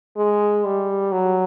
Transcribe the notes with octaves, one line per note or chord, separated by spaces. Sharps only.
G#3
G3
F#3